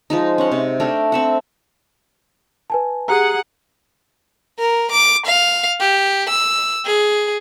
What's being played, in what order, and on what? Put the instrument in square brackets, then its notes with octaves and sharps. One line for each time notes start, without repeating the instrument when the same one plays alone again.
[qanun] F3 G#3 D#4
C#4 F#5
C3
A3 D4 A#4 G5
C4 E5 F#5
[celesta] B4 G#5 A5
[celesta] G4 A#5 [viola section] G#4 F#5
[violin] A#4
D6
F5
G4
E6
G#4